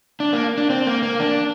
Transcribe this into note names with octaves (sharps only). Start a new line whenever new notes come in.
D4
A#3
D4
C4
A#3
A#3
D4